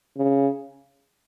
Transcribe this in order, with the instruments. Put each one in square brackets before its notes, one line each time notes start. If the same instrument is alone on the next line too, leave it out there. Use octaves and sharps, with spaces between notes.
[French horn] C#3